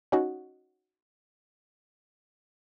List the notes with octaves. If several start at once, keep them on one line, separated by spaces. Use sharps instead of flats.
C#4 D#4 F#4 C#5